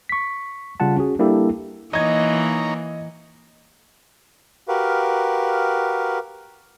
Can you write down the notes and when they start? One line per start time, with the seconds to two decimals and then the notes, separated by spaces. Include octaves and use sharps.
0.09 C#6 B6
0.80 C#3 G3 F4 F#5 A5
0.96 C#4 F#4 G#4
1.19 G3 A#3 D4 E4 G4 A4
1.93 E3 A#3 D#4 C#5 D#5 A#5 G#6
4.68 F#4 G4 A#4 B4 F5